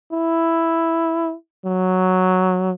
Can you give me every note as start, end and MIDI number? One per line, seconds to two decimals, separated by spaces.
0.12 1.35 64
1.65 2.72 54